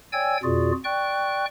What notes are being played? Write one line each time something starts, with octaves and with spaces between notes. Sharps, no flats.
C#5 D5 G5 G#5 E6 G#6
F2 B2 F4 F#4 G#4 D5
D5 G5 C#6 F#6